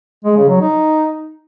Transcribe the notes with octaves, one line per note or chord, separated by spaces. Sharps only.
G#3
C#3
F#3
D#4